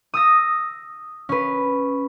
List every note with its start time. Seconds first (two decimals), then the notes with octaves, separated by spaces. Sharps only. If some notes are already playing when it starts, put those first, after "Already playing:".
0.14 D#6 E6 A#6
1.29 C#4 B4